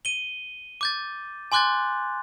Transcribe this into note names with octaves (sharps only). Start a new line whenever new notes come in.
D#7 G7
D6 G6 A6
G#5 C6 D6 F#6 G6 A6